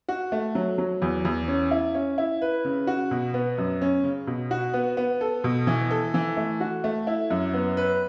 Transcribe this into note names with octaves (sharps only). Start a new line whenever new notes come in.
F#4
A3
F#3
F#3
E2
E2
C#4
E4
C#4
E4
B4
C#3
F#4
B2
B3
F#2
C#4
C#3
B2
F#4
B3
B3
A4
B2
E3
A4
E3
A3
F#4
A3
E4
F#2
B3
B4